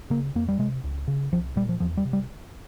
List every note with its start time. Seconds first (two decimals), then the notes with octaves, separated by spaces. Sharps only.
0.10 C#3 A#3
0.35 F2 A#3
0.49 G3
0.59 C3 G#3
0.84 C#2
1.08 C#3
1.32 C2 F3
1.56 A#2 G3
1.69 F3
1.80 E2 F3
1.97 G3
2.05 C3
2.13 G3